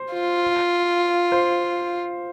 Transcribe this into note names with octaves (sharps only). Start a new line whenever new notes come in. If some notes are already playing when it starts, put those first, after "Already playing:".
Already playing: C5
F4
C5